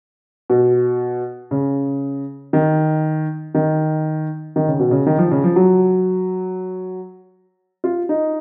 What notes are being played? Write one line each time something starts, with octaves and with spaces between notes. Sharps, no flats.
B2
C#3
D#3
D#3
D#3
C#3
B2
C#3
D#3
F3
C#3
F3
F#3
F4
D#4